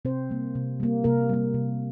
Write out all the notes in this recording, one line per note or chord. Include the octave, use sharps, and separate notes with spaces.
C3 C4 C5
G3 A#3
C3
G3 A#3
C3 A#3 A#4
G3 A#3
C3